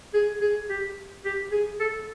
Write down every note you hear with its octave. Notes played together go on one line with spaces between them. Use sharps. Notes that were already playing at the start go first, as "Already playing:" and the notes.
G#4
G#4
G4
G4
G#4
A4